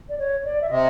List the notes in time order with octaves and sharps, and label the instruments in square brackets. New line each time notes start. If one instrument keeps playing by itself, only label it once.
[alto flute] D5
C#5
D5
E5
[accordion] C3 [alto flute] D#5